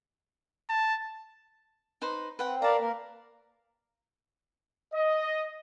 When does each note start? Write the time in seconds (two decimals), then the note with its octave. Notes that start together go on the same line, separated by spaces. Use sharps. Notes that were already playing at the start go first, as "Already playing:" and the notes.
0.70 A5
2.02 D#4 B4 C5
2.39 C4 B4 F#5 G5
2.62 A#4 B4 D5 F5 A5 A#5
2.79 A#3 A#4
4.94 D#5